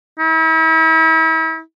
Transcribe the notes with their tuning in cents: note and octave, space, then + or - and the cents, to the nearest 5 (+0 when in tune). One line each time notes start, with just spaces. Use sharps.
E4 -40